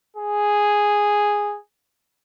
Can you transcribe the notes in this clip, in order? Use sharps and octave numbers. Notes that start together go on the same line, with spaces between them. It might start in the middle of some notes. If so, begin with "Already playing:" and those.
G#4